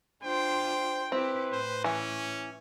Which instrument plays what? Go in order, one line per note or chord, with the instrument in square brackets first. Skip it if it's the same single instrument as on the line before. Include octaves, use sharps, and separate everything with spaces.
[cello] D4 F4 [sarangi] C5 [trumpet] G5
[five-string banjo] C4 [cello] E4 G4 [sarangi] B4
[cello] A2 [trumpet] C5
[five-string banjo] E3 [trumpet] C#4